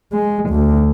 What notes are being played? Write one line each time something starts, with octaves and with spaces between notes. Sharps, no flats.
G#3
D2